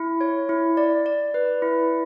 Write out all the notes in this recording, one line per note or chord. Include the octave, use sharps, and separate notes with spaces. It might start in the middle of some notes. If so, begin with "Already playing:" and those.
Already playing: E4
C#5
E4
D5
D5
B4
E4